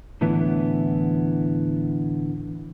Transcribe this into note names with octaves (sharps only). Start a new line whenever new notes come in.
A2 D3 E3 B3 E4